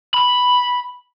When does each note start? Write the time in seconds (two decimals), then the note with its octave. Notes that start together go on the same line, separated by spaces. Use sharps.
0.14 B5